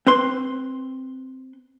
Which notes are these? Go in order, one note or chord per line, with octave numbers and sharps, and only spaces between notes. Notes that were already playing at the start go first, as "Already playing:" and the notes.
C4 B4 C6